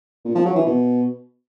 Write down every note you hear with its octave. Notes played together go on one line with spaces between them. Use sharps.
A#2
F3
F#3
E3
B2